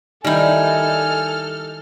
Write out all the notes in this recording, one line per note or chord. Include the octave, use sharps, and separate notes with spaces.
D#3 G3 D#4 E4 A4 G#5 F6